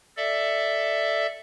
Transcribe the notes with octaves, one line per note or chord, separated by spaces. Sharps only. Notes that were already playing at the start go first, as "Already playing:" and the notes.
A4 D5 E5